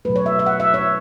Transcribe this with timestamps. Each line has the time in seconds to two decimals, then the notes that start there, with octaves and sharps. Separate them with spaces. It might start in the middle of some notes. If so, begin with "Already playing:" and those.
0.05 B2 F#3 A3 B4
0.16 C#5
0.26 E5
0.39 E5
0.46 F#5
0.60 E5
0.74 C#5